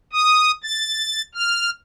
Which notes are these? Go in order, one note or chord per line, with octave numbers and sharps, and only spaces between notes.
D#6
A6
F6